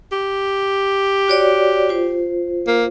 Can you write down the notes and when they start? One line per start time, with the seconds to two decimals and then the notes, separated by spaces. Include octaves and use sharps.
0.12 G4
1.28 F#4 C#5 D5
1.89 F4 C5
2.67 A#3